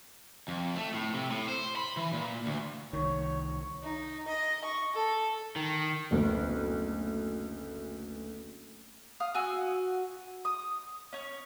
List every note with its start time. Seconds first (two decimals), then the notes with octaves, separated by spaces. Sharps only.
0.48 F2
0.76 A3
0.94 A2
1.14 C3
1.30 A2
1.48 C5
1.76 B5
1.97 E3
2.13 A#2
2.46 D2
2.93 C2 D#3 C#5
3.82 D#4
4.28 D#5
4.65 C#6
4.94 A4
5.56 D#3
6.11 F#1 D2 B3
9.20 F5 D#6
9.34 F#4 G#5 E6
10.45 D#6
11.13 C#4 C#5